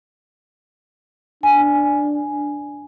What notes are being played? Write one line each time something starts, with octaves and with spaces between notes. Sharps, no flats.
D4 G#5